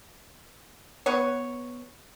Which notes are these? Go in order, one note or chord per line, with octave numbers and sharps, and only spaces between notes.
B3 C#5